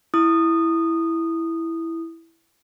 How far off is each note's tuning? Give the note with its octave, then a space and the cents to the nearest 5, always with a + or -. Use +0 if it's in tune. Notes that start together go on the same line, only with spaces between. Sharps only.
E4 +0 D#6 -15